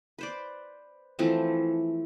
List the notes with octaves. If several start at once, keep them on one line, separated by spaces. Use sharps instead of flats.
B4 C5 D5
E3 F3 A3 C4